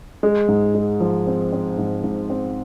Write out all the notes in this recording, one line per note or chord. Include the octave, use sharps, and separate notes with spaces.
G#3
G#2
G#3
F3
C4
C4
G#2
G#2
C4